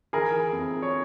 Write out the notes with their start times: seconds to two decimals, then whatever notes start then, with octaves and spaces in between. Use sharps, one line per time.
0.13 E3 G#4 A#4
0.53 F2
0.83 C#5